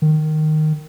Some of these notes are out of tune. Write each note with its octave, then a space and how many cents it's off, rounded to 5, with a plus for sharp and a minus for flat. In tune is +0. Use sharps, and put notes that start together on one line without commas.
D#3 -10